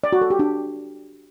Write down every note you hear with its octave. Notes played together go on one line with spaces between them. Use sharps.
D5
F#4
A4
G4
D4